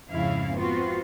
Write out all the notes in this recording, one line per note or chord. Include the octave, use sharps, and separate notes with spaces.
F2 G#2 C#3 C#4 E4 F5
B3 C4 F4 F#4